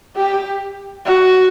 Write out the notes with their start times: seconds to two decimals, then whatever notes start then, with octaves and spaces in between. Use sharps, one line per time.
0.16 G4
1.06 F#4